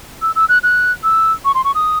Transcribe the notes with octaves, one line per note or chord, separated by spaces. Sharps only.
E6
E6
F#6
F#6
E6
C#6
C6
C#6
D#6